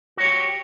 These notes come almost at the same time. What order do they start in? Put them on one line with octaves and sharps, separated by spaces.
F#4 C#5 G4